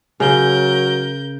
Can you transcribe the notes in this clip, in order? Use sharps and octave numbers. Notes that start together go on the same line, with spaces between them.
C#3 F#3 A#4 G6